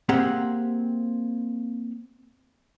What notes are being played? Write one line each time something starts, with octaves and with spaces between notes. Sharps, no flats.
A#3 C4 G4 G#4 F#5